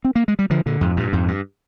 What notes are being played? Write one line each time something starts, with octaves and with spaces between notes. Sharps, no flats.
C4
A#3
G#3
G3
D3 F3
A#2 D3
F2 G#2
G2 A#2
F2 G#2
G2